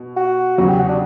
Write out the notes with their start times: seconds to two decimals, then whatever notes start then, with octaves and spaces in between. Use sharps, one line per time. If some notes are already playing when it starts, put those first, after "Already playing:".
Already playing: B2
0.17 F#4
0.58 E2 C#3 F#3 F#4
0.68 G4
0.79 F#4
0.89 D4